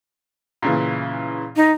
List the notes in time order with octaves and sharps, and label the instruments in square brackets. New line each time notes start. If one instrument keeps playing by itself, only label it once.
[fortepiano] A#2 C#3 E3
[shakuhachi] D#4